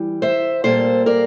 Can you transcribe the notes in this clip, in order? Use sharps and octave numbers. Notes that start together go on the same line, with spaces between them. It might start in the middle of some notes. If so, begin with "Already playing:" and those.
Already playing: E3 G3
C5 E5
A#2 G3 A#3 A4 C5
A#4 D5